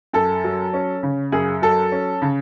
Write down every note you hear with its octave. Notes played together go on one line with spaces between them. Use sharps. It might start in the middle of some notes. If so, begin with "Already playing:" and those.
F#2 A4
F#3
C#4
C#3
F#2 G#4
F#3 A4
C#4
C#3